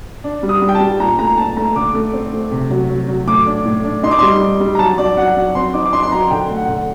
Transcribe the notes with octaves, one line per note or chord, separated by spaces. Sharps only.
D4
G3
D#6
G3
G5
A5
G3
A#2 A#5
A3 A#5
A#2 A5
A3 A#5
D3 D6
A3
C4
A3
C3
F#3
F#3
F#3
A2 D6
D4
A2
D4
D#4 C6
D6
G3 C6
G3
G3
A#5
F#3 A5
F#3 D5
F#3 F#5
F#3
C4 C6
D#4 D6
D6
D#4 C6
C6
F#3 A#5
D3 G5
A3
F#5
D3